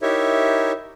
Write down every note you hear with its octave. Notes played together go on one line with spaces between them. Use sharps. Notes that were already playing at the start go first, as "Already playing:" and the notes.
D#4 E4 G4 A#4 C#5 E5